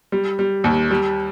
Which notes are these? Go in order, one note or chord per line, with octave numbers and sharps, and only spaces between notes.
G3
G3
D#2
G3